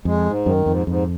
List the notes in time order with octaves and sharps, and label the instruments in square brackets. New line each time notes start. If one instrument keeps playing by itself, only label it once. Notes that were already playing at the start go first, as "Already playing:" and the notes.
[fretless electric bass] F2 [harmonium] G#3
[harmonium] G#2
[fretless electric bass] F#2 [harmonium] D#3
[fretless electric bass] F2 [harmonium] G#2
[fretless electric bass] F2 [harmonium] G#2